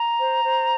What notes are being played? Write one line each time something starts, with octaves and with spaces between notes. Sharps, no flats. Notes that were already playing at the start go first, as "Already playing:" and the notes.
Already playing: A#5
C5
C5